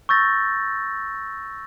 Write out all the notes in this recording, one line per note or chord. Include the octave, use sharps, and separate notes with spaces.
C#6 E6 G6 A6 A#6